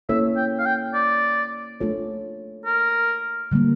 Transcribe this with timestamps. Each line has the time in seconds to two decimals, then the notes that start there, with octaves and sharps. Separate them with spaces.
0.09 A#3 C#4 E4 A4 C#5 E5
0.37 G5
0.59 F5
0.66 G5
0.94 D5
1.81 A3 D4 F4 A4 C#5
2.66 A#4
3.52 D3 G3 A#3